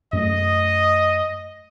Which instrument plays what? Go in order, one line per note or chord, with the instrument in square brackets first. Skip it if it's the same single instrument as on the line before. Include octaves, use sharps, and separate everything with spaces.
[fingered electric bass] F#2 A3 [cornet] D#5